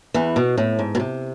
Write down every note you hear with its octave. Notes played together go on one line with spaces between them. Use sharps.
E2 E3
B2
A2
G#2
B2
C3